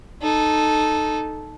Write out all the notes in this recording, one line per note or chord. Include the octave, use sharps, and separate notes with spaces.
D#4 A4